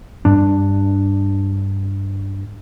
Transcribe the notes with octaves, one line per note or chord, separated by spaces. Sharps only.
G2 D4